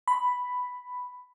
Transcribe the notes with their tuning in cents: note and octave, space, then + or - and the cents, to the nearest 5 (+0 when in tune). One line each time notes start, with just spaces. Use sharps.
B5 +5